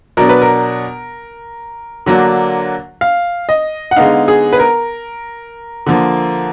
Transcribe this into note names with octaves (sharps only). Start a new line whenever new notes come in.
B2 F#3 D4 A#4
B4
A#4
D3 F#3 A#3 D4
F5
D#5
F#5
D3 G#3 B3 D#4 F5
G#4
B4
A#4
D3 F3 A#3